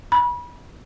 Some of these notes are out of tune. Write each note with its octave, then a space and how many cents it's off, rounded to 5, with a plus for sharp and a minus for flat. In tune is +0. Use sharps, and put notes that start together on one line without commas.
B5 -30